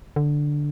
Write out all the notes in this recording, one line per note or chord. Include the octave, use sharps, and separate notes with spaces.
D3